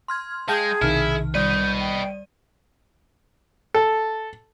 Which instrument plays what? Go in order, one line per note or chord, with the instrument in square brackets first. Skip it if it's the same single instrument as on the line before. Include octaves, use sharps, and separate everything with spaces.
[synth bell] C6 F6 G#6
[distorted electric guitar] G#3 [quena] G#4 [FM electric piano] F5 G5 G6 [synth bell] A5 D#6
[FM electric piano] B1 C3 D#3 [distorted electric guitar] E4 [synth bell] F6
[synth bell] G3 D5 D#7 [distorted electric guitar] B4 D#5 [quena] G6
[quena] G5
[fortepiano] A4